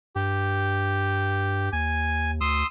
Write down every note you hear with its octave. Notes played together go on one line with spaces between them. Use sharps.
G2 G4
D#2 G#5
D2 C6 D#6 E6